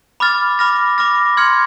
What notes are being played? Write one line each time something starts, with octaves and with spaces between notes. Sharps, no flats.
B5 D6 F6 A6
B5 D6 F6 A#6
B5 D6 F6 A#6
C6 F6 G#6 C#7